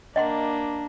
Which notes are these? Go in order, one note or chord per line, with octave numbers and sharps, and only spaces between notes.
A#3 D4 D#5 F#5 C6